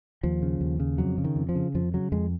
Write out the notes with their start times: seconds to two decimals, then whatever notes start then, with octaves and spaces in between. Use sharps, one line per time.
0.23 D#2 F3
0.42 C#3
0.61 D#2
0.79 C#3
0.98 F2 F#3
1.18 C#3
1.24 D#3
1.36 F2
1.49 F3
1.55 C#3
1.74 F2 F3
1.94 C#3 F#3
2.12 F2 G#3